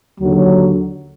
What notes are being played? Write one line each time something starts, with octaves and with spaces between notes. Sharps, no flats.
D#2 D3 F#3